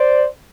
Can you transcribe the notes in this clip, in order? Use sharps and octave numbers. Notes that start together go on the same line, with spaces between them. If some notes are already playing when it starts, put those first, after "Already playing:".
Already playing: C5 D5